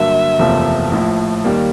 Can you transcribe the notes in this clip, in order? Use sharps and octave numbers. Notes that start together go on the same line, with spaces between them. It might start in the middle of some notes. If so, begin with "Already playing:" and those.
Already playing: G2 D3 F#3 A#3 E5
F#1 E2 C3 F3 A3
A#1 A2 F3
D#2 D#3 G3 A#3